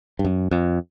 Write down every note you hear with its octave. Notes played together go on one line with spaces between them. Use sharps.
G2
F#2
F2